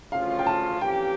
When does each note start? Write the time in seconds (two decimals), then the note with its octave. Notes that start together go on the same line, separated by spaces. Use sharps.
0.12 D2 C#3 F3 C#4 F4 F5
0.39 G5
0.46 A5
0.81 F2 E3 A#3 C#4 G4 G5